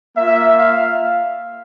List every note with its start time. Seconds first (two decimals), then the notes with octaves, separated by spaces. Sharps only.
0.17 A#3 F4 E5
0.59 F5